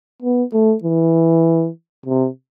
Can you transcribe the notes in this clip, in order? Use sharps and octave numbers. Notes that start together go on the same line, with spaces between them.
B3
A3
E3
C3